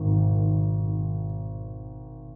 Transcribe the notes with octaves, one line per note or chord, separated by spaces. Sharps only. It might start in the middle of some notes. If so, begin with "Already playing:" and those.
Already playing: G#1 D#3
D#3
D#3